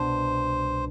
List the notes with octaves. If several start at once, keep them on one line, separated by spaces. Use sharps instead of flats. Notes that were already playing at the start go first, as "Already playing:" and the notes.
Already playing: C2 B2 B3 D4 C5